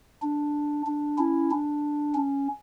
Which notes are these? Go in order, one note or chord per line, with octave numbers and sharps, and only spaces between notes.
D4
D4
C#4 E4
D4
C#4